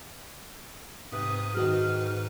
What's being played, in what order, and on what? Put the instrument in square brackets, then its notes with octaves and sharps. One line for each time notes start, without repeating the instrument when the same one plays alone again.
[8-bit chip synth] G#2 B4 [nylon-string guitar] C3 [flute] D#6
[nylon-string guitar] D#3 F#4 G#4 [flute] F6